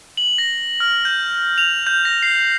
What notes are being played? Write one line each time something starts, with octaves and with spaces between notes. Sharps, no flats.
F#7
A#6
F6
G6
F7
G6
A#6
C7